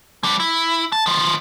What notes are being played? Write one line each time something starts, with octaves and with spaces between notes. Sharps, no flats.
F3 G3
E4
A5
D#3 F3